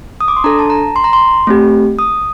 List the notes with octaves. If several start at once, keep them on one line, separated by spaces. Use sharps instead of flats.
D#6
D6
C6
D4 A4 A#5
A5
A#5
C6
A#5
C6
A3 C4 G4
D#6